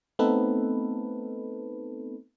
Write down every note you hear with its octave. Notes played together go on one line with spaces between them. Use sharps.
A3 B3 C4 D#4 A4 B4